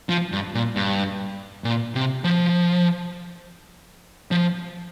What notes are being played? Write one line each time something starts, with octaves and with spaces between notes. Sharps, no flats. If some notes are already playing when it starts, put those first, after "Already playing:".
F3
G2
A#2
G2
A#2
C3
F3
F3